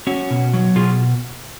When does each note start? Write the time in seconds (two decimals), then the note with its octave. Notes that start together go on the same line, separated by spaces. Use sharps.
0.07 C#4 F#4
0.31 B2
0.54 F#3
0.76 B2 F4 G#4